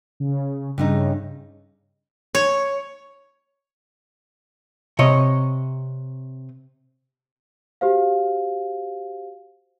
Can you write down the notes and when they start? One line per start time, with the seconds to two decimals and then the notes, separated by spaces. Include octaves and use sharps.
0.20 C#3
0.78 G2 C#3 A3 D#4
2.35 C#5
4.99 C3 C#5 D#5
7.81 F#4 G4 C5 F5